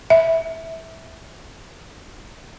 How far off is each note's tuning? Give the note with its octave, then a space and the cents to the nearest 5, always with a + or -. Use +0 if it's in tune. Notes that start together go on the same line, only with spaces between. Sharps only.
E5 -10